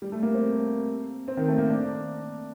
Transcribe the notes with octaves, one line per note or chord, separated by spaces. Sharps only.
G3
A3
A#3
C4
C4
D#3
A3
A#3
D4